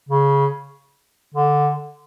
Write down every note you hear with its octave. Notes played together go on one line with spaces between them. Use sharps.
C#3
D3